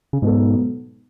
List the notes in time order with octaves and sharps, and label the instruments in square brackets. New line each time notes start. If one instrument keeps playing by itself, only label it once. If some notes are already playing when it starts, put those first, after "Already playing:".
[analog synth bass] C#3
[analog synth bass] G#2 [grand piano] B2 F#3 B3 D#4 A4